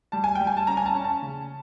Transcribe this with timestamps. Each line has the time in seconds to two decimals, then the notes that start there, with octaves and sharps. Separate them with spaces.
0.12 G3 A5
0.24 G#5
0.35 G3 G5
0.47 G#5
0.57 A5
0.67 C#4 A#5
0.77 G#5
0.86 A5
0.95 C#4
1.04 A5
1.22 C#3